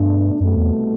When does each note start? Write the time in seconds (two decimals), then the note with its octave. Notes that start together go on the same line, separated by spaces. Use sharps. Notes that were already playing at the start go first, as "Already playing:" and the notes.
Already playing: G2 B2 A3 D4
0.40 C2 F#2 B2 A3
0.57 E2